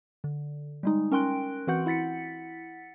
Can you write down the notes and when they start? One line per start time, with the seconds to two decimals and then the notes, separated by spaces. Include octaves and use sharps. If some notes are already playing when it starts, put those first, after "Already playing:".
0.24 D3
0.83 G3 G#3 D#4
1.11 C#4 A#4 G5 C6 F#6 D7
1.67 E3 C4 F#4 F#5 G6
1.86 E4 F#5 A6 B6 C#7